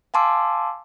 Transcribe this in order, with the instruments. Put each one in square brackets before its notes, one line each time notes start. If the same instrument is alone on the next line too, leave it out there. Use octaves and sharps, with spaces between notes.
[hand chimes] F5 G#5 A5 C6 D6 E6